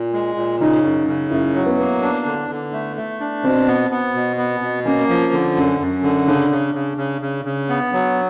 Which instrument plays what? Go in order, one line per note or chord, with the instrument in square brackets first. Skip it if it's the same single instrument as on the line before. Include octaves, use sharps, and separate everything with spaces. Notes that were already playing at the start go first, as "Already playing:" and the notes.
Already playing: [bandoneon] A#2
G#3
A#2
[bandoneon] C#3 [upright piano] D#4
[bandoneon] F#2
C#3
[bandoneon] F#2 [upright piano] E4
[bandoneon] F#3
[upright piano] B3
[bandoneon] A#3
D4
D3
D3
A3
A3
D4
[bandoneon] B2 [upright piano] C4
[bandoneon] B3
B3
B2
B3
B2
[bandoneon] A#3 [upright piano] C#4
[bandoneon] F3
D3
F#2
F#2
D3
[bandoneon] C#3 [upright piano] D4
[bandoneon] C#3
C#3
C#3
C#3
C#3
B3
F#3